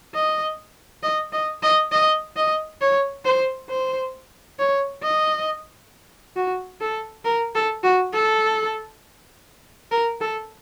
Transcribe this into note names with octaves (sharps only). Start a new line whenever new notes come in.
D#5
D#5
D#5
D#5
D#5
D#5
C#5
C5
C5
C#5
D#5
F#4
A4
A#4
A4
F#4
A4
A#4
A4